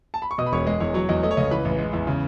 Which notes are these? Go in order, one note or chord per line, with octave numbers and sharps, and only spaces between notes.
A5
B5
C#6
B2 D#5 D#6
B5
E1 C#5 C#6
G#3 D#5
E2 C#5
F#3 C#5
E2 D#5
A3 D#5
C#5
C#2 D#5
E3 B4 B5
A1
G#3
E2
C#3